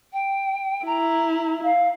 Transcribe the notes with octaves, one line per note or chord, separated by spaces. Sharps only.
G5
E4 A#5
F5